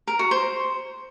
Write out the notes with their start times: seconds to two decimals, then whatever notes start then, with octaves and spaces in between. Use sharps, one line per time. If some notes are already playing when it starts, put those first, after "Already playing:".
0.07 A#4
0.19 F#4
0.31 C5